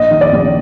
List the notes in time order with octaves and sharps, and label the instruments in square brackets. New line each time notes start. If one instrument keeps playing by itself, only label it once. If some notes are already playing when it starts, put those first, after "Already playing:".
Already playing: [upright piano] A#1 D#5
D#3
D5
A#1